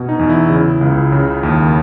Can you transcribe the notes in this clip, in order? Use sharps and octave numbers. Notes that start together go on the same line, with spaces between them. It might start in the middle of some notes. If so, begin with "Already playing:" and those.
Already playing: B2
D#4
E2
E4
C#3 E4
C#2
C#3
D#2